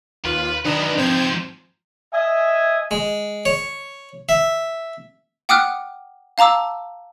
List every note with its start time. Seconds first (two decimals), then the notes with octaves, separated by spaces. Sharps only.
0.25 D#2 F4 B4
0.65 F#2 D#3 D4 B4 D#5 A#5
0.98 G#2 F3 C4 C5 G6 G#6
2.13 D#5 E5 G#5
2.91 G#3
3.45 C#5
4.29 E5
5.49 F#5 G5 D6 D#6 F6 F#6
6.38 F5 A5 A#5 D6 E6